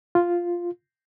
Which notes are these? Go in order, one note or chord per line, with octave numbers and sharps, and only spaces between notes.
F4